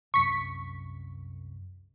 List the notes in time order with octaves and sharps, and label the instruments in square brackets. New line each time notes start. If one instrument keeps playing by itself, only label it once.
[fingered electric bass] C2 F#2 [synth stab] C#6 B6